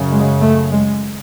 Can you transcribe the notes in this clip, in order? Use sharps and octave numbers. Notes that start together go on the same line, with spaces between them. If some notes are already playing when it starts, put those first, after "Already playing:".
Already playing: F#2 C#3
G#3
A3
G#3